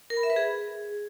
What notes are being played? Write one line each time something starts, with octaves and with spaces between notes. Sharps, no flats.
A#4
B5
E5
B4
G#4